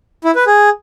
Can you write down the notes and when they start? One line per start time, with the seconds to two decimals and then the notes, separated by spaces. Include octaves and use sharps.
0.24 E4
0.35 B4
0.47 G#4